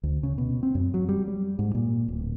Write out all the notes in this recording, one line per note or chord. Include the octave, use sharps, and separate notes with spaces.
D2
C#3
B2
C4
F#2
F#3
G3
G3
G#2
A#2
D1